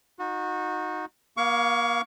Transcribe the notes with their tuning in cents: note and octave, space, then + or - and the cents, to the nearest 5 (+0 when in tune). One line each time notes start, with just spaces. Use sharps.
D#4 +5 F#4 -25
A#3 +40 F5 +0 C#6 +30